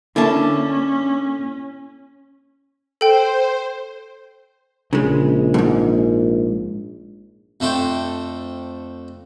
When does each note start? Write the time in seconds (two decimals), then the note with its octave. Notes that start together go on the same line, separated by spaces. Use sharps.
0.16 D3 A#3 C#4 E4 E5 A5
3.01 A4 C5 G5
4.93 A#1 C#3 G#3
5.54 F2 G#2
7.60 F2 A3 D4 C5 G5